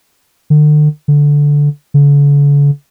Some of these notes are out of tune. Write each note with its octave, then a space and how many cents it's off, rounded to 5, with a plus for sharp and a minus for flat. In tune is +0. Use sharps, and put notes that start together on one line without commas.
D3 +40
D3 -10
D3 -45